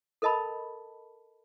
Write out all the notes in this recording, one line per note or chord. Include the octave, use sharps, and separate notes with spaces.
A4 A#4 D#5 A5 B5